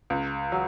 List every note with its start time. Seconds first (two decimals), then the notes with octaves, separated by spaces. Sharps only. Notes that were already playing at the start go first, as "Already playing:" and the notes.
0.10 C#2
0.52 F#3